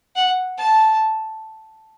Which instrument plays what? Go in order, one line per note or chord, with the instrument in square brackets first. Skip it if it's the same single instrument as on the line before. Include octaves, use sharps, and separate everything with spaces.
[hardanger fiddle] F#5
A5